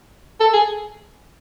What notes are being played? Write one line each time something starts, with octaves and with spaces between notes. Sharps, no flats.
A4
G#4